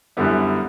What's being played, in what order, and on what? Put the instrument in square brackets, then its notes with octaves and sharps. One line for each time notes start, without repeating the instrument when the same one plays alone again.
[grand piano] F#2 D3 G3 B3 E4